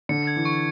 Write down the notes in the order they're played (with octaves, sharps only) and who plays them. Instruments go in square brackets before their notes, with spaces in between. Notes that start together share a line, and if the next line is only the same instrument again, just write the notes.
[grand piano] D3 [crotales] C#7
[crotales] G#6
[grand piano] E3
[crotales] C#6